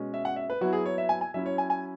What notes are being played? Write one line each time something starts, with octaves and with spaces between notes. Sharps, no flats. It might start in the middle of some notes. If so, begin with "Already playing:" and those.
Already playing: B2 G#3 C#4
E5
F#5
E5
B4
F#3 B3 E4 F#4
G#4
C#5
E5
G#5
G#5
F#3 C#4 E4 E5
C#5
G#5
G#5